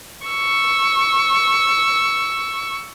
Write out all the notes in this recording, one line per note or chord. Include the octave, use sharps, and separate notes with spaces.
C#6 E6